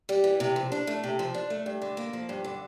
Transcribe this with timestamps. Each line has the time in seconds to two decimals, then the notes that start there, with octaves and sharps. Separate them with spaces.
0.09 G3
0.24 E3
0.40 C3
0.56 F3
0.72 D4
0.87 A3
1.04 C3
1.19 F3
1.34 D4
1.50 A3
1.66 G2
1.82 D3
1.97 A#3
2.13 F3
2.29 G2
2.44 D3